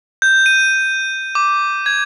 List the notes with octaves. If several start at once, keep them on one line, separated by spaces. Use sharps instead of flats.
G6
D#7
D6
G#6